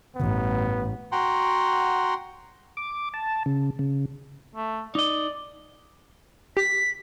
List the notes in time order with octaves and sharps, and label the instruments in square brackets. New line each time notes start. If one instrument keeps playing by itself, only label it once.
[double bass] A1 G2 [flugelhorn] B3
[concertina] F#4 F#5 G5 A#5 C6
[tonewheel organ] D6
A5
C#3
C#3
[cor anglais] A3
[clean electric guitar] D#4 D#5 [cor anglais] D5
[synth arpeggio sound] G4 [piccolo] B6